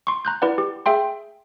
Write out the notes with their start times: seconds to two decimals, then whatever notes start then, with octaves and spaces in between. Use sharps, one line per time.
0.07 C6 C#6
0.25 A#5 F#6 G6
0.42 E4 B4 D5 F#5
0.58 G4
0.86 G#4 E5 G5 C6